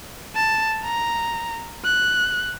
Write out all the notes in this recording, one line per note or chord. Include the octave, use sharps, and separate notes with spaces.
A5
A#5
F#6